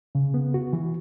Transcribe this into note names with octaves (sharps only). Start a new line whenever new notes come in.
C#3
B3
F#4
E3